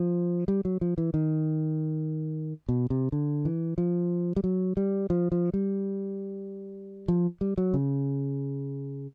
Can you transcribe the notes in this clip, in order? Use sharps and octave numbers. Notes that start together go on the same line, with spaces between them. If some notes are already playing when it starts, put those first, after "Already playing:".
Already playing: F3
G3
F#3
F3
E3
D#3
B2
C3
D3
E3
F3
G3
F#3
G3
F3
F3
G3
F3
G3
F#3
C#3